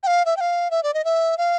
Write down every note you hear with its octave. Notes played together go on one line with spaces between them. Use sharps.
G5
F5
E5
G5
F5
E5
D5
D#5
E5
F5